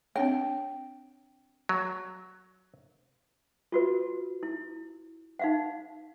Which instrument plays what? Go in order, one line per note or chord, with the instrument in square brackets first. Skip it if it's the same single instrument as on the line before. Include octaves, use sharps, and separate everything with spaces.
[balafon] C4 D4 C#5 [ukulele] G5
[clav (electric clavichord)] F#3
[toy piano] F4 F#4 B4
E4
D#4 F5 F#5